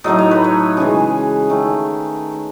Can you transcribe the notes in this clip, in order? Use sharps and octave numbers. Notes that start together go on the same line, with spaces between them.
A2 F#3 A3 D#4 D#5
C#5
B4
C#5
C#3 E3 G#3 G#4
D#3 A3 C#4